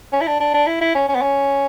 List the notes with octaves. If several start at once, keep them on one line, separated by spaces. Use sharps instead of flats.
C#4
E4
D4
D4
D4
E4
E4
C#4
C#4
B3
C#4